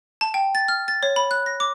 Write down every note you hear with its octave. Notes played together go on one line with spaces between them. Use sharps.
A5
G5
A6
F6
A6
C#5
B5
F#6
A#6
D6